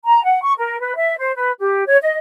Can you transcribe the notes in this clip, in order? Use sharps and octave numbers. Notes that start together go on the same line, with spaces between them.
A#5
F#5
C#6
A#4
B4
E5
C5
B4
G4
C#5
D#5